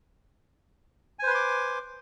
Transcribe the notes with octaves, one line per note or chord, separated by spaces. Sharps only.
B4 C5 G#5 C6 D6